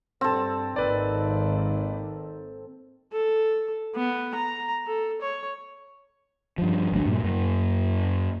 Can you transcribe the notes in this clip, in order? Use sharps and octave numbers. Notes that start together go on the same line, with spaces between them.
G2 C4 A4
G#1 D#3 A#3 B4 D5
A4
B3
A#5
A4
C#5
G2 F3
G#1 D2 F#3 D4
G2 A#2
F#2 A#3